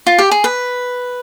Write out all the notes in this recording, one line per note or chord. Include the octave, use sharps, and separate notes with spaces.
F4
G4
G#4
B4